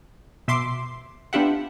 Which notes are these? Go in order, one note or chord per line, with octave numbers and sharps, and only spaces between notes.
B2 E5 C6 D6 C7
B3 D4 F4 G4 E5 F#5